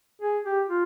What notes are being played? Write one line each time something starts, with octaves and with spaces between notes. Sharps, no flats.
G#4
G4
F4